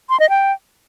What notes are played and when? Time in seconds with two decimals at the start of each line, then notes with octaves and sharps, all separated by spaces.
0.10 C6
0.20 D#5
0.30 G5